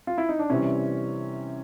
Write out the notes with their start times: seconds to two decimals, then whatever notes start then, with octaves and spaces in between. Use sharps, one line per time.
0.07 F4
0.18 E4
0.29 D#4
0.39 D4
0.50 C3 E3 G3 C4 C#4